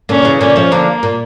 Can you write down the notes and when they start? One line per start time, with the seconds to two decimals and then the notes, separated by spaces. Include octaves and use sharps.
0.09 A#2 D3 C#4
0.25 C#3 E3
0.40 A#2 D3 C#4
0.56 F3 A3
0.72 D3 F3 A#3
1.03 A#2